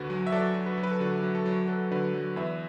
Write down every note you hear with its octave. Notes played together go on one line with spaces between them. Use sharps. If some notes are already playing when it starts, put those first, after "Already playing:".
Already playing: D2 D3 F#4 B4
F#3
E5
F#3 A4 D5
F#3
F#4 B4
F#3
B4
A4
D3 F#4
F#3
A4
F#3
F#3 A4
D3 F#4 B4
F#3
E2 B4 E5